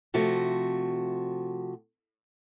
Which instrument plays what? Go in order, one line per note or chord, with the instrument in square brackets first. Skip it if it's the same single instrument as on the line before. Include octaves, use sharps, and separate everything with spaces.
[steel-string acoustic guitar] C3 F3 A3 F#4